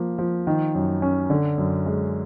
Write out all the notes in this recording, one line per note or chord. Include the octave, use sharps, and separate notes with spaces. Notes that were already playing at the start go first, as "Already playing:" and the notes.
Already playing: F3 A#3
F3
D#3
F#2
C#4
D3
F#2
G#3